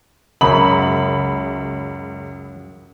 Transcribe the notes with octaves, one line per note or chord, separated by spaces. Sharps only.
C#2 F#2 B5 F#7